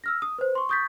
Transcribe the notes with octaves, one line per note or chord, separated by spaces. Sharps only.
E6 F6 A#6
D#6
B4 C5
C6 C#6
C#6 D#6 G6 A6 B6